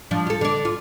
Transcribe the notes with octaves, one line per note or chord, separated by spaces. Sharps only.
F3 D4
F4 A4
D3 D5
F4